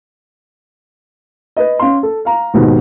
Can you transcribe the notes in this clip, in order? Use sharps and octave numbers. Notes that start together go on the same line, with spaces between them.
B4 D#5
C#4 F5 C6
A4
F5 A#5
D#2 G#2 B2 D#3